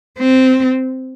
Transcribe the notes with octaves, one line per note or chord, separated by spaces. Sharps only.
C4